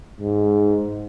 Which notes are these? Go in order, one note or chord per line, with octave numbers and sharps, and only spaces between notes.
G#2